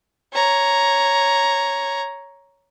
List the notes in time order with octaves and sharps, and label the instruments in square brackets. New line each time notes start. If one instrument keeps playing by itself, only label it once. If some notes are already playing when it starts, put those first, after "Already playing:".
[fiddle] C#5 A#5